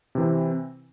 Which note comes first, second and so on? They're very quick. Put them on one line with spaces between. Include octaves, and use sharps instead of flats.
C3 E3 C4